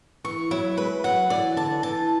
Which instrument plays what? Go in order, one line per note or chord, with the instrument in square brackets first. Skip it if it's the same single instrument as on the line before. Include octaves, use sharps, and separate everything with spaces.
[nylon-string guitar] E3 [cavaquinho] C#6
[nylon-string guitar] F#3 [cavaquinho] E4
[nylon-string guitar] G#3 [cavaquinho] B4
[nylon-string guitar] F#3 [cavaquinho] F#5
[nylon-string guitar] E3 [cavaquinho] D5
[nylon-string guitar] D3 [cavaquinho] A5
[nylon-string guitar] E3 [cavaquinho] A5